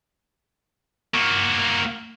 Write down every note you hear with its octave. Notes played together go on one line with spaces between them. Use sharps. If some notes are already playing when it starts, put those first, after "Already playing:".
A#3 F#4